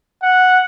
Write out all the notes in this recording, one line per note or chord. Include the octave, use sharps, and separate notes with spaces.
F#5